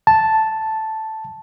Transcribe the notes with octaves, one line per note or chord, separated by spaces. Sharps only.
A5